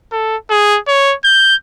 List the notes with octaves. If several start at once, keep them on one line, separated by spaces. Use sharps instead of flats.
A4
G#4
C#5
G6